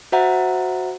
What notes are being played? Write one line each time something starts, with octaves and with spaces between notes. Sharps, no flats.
F#4 C5 E5 F#5 A#5